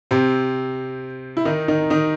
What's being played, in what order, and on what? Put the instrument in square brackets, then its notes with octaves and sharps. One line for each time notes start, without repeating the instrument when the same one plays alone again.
[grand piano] C3 C4
E4
D#3 D#4
D#3 D#4
D#3 D#4